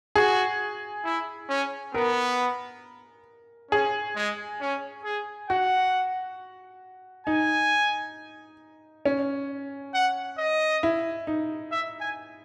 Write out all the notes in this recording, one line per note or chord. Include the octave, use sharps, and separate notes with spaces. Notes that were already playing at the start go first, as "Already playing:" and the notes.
F#4 G#4
E4
C#4
B3 A#4
C#4 G#4
G#3
C#4
G#4
F#4 F#5
D#4 G#5
C#4
F#5
D#5
E4
D#4
E5
G#5